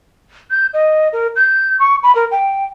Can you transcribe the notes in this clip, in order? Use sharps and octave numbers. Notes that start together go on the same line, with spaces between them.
G6
D#5
A#4
G6
C#6
B5
A#4
G5